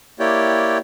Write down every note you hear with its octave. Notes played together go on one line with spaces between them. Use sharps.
A#3 E4 G4 C#5 D5 G5